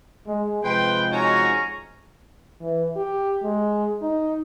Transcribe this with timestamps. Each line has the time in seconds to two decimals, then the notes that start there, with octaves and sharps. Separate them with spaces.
0.27 G#3
0.64 C3 F3 G#3 B4 G5 C6
1.12 C#4 D#4 F#4 C#5 G#5 A#5 C#6
2.61 E3
2.96 G4
3.43 G#3
4.02 D#4